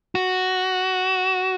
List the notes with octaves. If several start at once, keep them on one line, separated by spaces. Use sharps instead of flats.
F#4